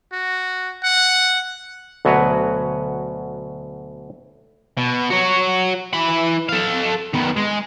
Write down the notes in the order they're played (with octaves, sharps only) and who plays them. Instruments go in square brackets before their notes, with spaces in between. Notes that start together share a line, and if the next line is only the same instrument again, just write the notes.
[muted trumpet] F#4
F#5
[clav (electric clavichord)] D2 B2 F#3 F#4 B4 C#5
[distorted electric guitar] B2
F#4 C#5
E3 B5
A4 F5
D#3 B3
G#3